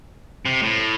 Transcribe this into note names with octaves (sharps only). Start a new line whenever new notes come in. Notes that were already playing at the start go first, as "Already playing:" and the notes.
C3
A2